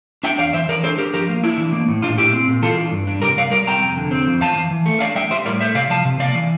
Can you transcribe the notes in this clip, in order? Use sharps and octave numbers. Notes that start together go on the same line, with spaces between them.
D4 E5 G5
E2 D5 F5
E3 C5 E5
E3 A#4 D5
D4 A4 C5
D4 G4 A#4
F3 G4 A#4
A#3
D4 E4
E3
A#3
A2
A#2 D4 F4
A#2 E4 G4
C4
A#2
E3 F4 A4
D4
G2
D4
C3 G4 A#4
G3 D5 F5
G3 A#4 D5
C3 G5 A#5
F2
D3
C4
F2
E2 F5 A5
E3
E3
A3
D4 D5 F5
G3 E5 G5
G3 C5 E5
A2 A#4 D5
A3 C5 E5
C3 D5 F5
F3 F5 A5
C3
A#3 D5 F5
E3